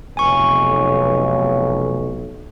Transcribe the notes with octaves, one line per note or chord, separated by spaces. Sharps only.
F1 B1 G#5 C#6